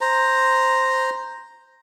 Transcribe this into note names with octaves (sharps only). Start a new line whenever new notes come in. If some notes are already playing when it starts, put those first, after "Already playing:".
C5 A#5